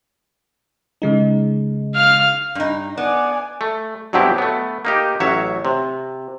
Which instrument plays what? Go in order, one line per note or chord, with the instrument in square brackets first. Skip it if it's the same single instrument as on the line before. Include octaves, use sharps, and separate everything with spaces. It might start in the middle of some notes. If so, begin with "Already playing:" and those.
[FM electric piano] C#3 G#3 D#4
[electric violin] F5 F6
[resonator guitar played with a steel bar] G2 D#4
[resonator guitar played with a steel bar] B3 [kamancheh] D5 G#5
[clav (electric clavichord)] A3
G2 B2 F#3 C4 E4 G4
A3 B3
A#3 D#4 G4
A1 F#3 C#5 E5
C3